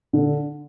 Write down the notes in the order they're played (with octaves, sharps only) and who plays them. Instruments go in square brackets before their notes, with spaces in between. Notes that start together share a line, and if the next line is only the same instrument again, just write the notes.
[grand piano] D3